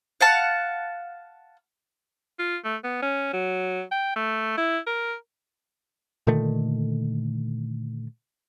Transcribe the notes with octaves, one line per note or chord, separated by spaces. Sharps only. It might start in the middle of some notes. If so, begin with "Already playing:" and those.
F5 F#5 A5
F4
A3
B3
C#4
F#3
G5
A3
E4
A#4
A#2 D3 D#3 A3